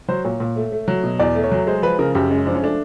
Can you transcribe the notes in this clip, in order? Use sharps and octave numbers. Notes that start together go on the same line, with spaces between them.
F#3 C5
A#2 C#5
A#2
A3
A3
F#3
B2
E2 D5
A3
C#5
F#3
G#3 C5
F3 B4
C#3 A#4
F#2 G4
G#3 C#4
F3 D4
C#4
A3 D4